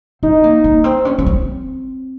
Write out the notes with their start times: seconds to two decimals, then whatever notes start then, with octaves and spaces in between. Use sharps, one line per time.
0.23 C4 D#4
0.44 A#3
0.64 A#3
0.84 C4
1.05 C#4
1.19 C#4
1.26 C4